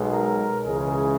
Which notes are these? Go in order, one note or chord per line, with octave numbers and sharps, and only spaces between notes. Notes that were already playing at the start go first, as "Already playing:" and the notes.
Already playing: B1 B2 G#3
A#4
C#2 C#3 E3 G#3 G#4